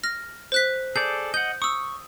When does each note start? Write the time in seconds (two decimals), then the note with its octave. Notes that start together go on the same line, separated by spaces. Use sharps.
0.04 F6 A#6
0.52 C5 F#6 B6
0.96 G#4 A4 D5 G6
1.34 D#5 F#5 G6
1.62 C#6 D#6 E6